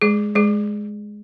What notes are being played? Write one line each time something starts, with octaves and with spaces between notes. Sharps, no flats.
G#3 G#4
G#3 G#4